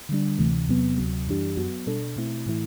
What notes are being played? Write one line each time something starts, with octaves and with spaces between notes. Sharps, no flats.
D3 G3 D4
D2 C3 E3 A3
E2 C3 F#3 B3
D2 C3 F#3
F#2 E3 G3 D4 G4
F#2 F#3 B3 F#4
B2 G3 D4 A4
B2 A3 C4 E4
A2 E3 A3 E4